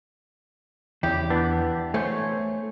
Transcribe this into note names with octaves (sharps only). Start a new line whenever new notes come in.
E2 C#3 E4 G4
E3 B3 D4
A3 C#4 C5 C#5